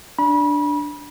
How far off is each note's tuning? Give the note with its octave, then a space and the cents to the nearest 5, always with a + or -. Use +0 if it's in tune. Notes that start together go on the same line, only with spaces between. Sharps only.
D4 +0 B5 -30